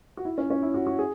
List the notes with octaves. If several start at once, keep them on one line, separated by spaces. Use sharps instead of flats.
F#4
E4
C#4
C#4
E4
F#4
F#4
G#4